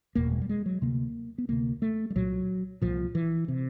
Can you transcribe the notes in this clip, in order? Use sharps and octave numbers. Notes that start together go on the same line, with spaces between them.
F#1 E2 B2 A#3
G#3
G3
G#3
F#3
D2 C3 A#3
B3
D2 C3 A#3
A3
G3
C2 A#2 F#3
C2 A#2 F3
E3
C3